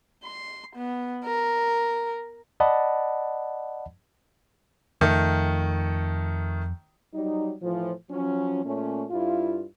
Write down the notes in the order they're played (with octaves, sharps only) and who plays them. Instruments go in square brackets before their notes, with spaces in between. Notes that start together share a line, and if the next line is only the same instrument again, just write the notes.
[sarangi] C6
B3
A#4
[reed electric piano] D5 D#5 F#5 A5 B5
[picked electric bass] F2 [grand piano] D#3 A3
[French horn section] F#3 G3 D#4
A2 E3 F3
F3 F#3 C#4
A#2 A3 C#4
G2 E4 F4